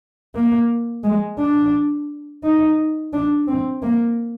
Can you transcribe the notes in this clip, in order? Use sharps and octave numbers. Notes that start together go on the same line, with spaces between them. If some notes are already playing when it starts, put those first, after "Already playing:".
A#3
G#3
D4
D#4
D4
C4
A#3